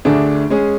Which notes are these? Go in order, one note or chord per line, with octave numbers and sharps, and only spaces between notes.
D2 D3 A3 D4 G#4
G#3 C#4 G#4